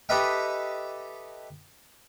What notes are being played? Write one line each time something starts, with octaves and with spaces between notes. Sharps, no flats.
G4 A4 B4 D#5 E5 G5